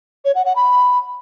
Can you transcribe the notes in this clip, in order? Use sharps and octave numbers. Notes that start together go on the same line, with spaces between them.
C#5
F#5
F#5
B5